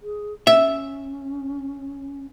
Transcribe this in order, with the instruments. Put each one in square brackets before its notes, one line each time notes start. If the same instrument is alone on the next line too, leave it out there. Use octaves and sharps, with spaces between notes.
[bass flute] G#4
[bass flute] C#4 [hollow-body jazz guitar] E5